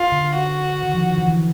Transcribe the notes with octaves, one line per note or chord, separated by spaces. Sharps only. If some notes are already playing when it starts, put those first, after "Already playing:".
Already playing: F4
D3
F#4
D#3
F3
E3
E3